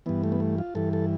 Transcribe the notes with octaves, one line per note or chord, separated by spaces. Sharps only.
G2 E3 B3
A3
B3
A3
F4
G2 E3 A4
A4